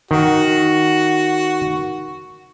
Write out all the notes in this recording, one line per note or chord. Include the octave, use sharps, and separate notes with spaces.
D#3 F#4